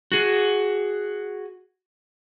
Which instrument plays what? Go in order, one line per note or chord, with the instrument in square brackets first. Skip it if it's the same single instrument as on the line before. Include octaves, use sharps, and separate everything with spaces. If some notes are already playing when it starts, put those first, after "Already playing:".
[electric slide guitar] F#4 G#4